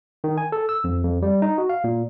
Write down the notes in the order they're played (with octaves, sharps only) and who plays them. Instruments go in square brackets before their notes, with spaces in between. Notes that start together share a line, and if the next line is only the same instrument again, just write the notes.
[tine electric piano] D#3
G#5
A4
E6
F2
F2
G3
D#4
F#4
F5
A#2